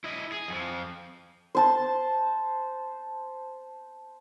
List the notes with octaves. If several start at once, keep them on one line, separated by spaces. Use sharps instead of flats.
E4 D#5
G#4
F2 F3
C5 A5